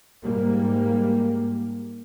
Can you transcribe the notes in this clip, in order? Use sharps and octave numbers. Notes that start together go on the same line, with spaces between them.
G#2 G3 A#3